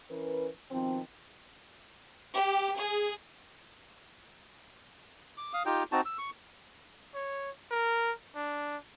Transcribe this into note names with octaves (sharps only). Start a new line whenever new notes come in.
E3 C#4 A#4 B4
B2 D#3 F3 C4
G4
G#4
D6
F5 D#6
D#4 F4 G4 G5
C4 D#4 F#4 A5
E6
C#6
C#5
A#4
D4